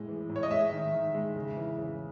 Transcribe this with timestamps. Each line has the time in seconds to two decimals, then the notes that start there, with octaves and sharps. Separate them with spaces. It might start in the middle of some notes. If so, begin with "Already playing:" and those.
Already playing: A2 G#3
0.09 E3
0.29 A2
0.36 C#5
0.43 D#5
0.51 G#3 E5
0.72 D#3
0.94 D#3
1.14 G#3
1.36 C#3
1.57 E3
1.78 C#3